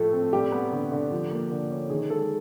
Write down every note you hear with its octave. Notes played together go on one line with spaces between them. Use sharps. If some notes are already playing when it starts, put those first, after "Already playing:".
Already playing: A2 F3 A3 A4
C4
G3 G4
B3
D3
D3
F3
A#3
D3
C#4
D#3 G#4
G#3 A4